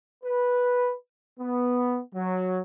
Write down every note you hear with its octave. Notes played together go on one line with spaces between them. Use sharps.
B4
B3
F#3